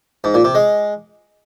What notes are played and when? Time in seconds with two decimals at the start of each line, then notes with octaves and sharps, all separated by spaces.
0.24 G#2
0.34 A#2
0.44 C3
0.55 G#3